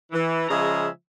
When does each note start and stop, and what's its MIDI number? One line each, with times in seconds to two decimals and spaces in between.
0.12 0.49 52
0.49 0.86 49
0.49 0.86 53
0.49 0.86 56
0.49 0.86 68
0.49 0.86 76
0.49 0.86 82